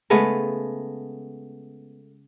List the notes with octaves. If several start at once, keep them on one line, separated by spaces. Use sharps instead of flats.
C#3 G#3 A3 B3